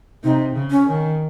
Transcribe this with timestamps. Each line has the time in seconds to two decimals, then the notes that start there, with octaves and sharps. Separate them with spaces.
0.23 C3 D#4
0.56 C#3
0.71 C#4
0.87 D#3